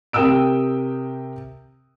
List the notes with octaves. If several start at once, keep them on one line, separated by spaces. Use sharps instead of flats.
C3 A#4 G5 D#6 E6 D7